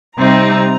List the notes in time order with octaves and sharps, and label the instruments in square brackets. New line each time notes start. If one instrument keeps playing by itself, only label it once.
[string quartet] C3 G3 C4 D#4 A#5